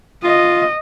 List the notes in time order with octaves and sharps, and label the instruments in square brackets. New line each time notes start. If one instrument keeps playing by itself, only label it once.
[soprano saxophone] F4 [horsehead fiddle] D#5